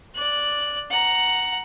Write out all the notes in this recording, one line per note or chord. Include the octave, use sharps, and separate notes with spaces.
D5 F#6
F#5 A#5